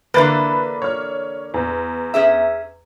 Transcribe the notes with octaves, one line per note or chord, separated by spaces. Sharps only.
D3 E3 A#3 B4 F#6 A6
C#5 F6
E2
C#4 G#4 E5